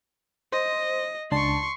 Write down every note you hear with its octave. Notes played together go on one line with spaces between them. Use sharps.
C5 D#5
C#2 D4 A5 C6 C#6